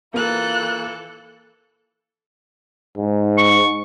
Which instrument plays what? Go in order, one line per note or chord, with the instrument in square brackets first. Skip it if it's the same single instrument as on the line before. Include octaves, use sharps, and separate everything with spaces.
[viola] E3 A4 [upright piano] A#3 [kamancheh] F4 F#6
[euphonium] G#2
[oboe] C#6